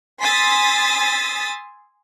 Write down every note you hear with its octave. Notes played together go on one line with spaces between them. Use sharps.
G#5 C6 D#6 E6 A6 B6